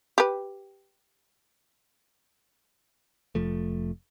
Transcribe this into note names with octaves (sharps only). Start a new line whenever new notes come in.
G4 B4
F1 F3 A3